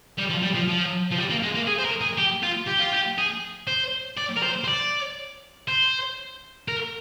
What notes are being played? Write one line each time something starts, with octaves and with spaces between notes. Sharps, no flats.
G3
F3
G3
F3
F3
F3
G3
A#3
G#3
A#3
G#4
C5
A#4
G#4
G4
F4
G4
F4
G4
G#4
C5
D5
A#4
C5
C5
D5
C5
A#4